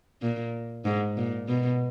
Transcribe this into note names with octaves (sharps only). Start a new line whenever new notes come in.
A#2
G#2
A#2
B2